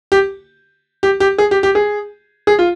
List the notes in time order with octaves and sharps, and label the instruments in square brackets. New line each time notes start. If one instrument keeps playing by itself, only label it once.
[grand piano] G4
G4
G4
G#4
G4
G4
G#4
G#4
F4